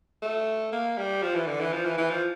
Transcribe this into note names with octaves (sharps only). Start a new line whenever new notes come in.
A3
A#3
G3
F3
E3
D3
E3
F3
E3
E3
F3